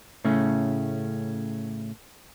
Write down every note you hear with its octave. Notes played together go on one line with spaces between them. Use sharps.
A2 C#3 A3 C#4